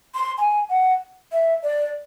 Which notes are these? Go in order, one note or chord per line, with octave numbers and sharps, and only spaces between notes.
C6
G#5
F#5
E5
D5